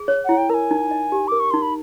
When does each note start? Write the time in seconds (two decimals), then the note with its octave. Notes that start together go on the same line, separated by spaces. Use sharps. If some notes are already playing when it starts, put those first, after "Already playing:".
Already playing: G#4
0.08 C#5
0.25 E4 F#5
0.37 G5
0.50 A#4 A#5
0.54 G#5
0.71 D#4
0.91 D#5
1.12 G4
1.28 A#4 D6
1.40 C#6
1.51 D#4 C6
1.62 B5